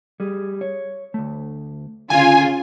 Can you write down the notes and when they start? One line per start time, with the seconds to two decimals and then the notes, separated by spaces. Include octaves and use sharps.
0.20 G3 G#4
0.61 C#5
1.14 D2 A3
2.10 D2 C#3 F4 G#5